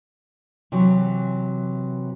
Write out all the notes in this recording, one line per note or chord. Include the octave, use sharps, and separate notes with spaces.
C3 E3 F#3